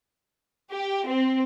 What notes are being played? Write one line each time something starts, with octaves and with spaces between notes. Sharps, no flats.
G4
C4